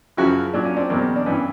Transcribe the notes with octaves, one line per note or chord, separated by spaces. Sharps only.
F#2 C#3 F3 E4 F#4
A#2 F#3 D4
C#4
C4 D4
E2 B2 F#3 A#3 C4
D4
G2 E3 B3 C#4